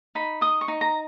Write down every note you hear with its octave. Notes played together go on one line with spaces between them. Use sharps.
D#4 B5
D#5 D#6
C#6
D#4
A#5